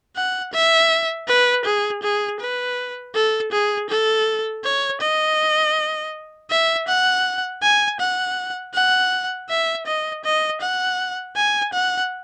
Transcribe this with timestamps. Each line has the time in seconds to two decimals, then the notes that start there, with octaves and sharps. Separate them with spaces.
0.16 F#5
0.53 E5
1.28 B4
1.65 G#4
2.03 G#4
2.40 B4
3.15 A4
3.52 G#4
3.89 A4
4.64 C#5
5.01 D#5
6.51 E5
6.88 F#5
7.62 G#5
8.00 F#5
8.74 F#5
9.49 E5
9.87 D#5
10.24 D#5
10.61 F#5
11.36 G#5
11.73 F#5